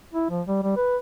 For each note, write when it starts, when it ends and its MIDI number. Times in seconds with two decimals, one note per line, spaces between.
0.13 0.28 64
0.30 0.42 53
0.47 0.59 55
0.64 0.76 55
0.77 0.97 71